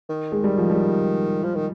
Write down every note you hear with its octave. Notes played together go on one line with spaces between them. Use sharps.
D#3
G#3
G3
F3
G3
F3
D#3